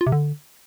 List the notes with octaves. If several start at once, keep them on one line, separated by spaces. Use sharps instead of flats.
F4
C3
D3